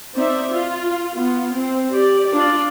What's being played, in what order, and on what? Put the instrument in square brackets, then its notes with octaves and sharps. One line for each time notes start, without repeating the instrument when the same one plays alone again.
[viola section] C4 D#4 D5 E5
F4
B3 F4
C4
G4 D5
D4 F4 D5